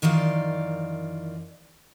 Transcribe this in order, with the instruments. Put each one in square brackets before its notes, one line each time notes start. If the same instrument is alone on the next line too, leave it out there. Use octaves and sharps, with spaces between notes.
[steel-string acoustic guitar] F#2 D#3 E3 F4 D5